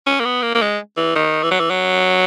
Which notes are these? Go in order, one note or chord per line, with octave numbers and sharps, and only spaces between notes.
C#4
A#3
B3
A#3
A#3
G#3
E3
D#3
E3
F#3
E3
F#3